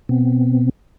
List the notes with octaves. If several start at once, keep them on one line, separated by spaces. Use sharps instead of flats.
B2 B3 C4